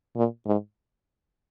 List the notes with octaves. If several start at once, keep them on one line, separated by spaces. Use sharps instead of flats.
A#2
G#2